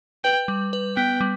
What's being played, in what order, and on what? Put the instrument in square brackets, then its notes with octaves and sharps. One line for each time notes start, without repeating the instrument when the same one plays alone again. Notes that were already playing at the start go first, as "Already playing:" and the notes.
[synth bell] B4 [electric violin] G5
[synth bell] G3
B4
[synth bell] B3 [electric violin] G5
[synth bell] G3